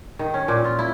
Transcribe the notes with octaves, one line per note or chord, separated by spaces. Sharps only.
D#3
C#4
A#2
F4
E4